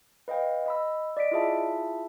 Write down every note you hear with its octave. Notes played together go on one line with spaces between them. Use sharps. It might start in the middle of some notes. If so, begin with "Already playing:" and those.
B4 D#5 F5 G5
D#5 B5 E6
D5 D#5 B6 D7
E4 F4 G#4 E5 A5